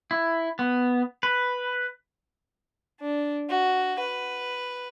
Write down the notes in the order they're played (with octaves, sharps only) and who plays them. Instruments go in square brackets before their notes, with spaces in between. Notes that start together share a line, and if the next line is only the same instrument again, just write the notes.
[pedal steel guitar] E4
B3
B4
[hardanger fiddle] D4
F#4
B4